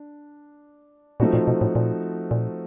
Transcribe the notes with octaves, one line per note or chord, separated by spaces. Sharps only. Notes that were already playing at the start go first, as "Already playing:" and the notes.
Already playing: D4
A#2 F3 A3 C4 D#4 F#4
A#2
B2
A2
A#2
A#2